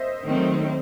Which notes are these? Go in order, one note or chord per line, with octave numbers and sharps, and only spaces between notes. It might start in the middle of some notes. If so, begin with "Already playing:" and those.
Already playing: C5 D#5 E5
D#3 F#3 A3 C4